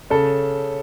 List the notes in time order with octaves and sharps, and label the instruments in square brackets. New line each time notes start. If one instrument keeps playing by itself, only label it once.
[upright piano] C#3 A4